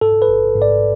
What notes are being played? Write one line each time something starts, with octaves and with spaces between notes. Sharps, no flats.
G#2 A4
B4
A1
G#2
D5